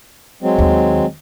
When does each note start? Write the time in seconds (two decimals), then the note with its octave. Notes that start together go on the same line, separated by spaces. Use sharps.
0.42 F#3 G#3 C4
0.58 D#2